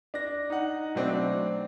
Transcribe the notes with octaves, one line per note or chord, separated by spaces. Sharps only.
D4 A#6
D#4 F#5
B2 F#3 A3 C4 D4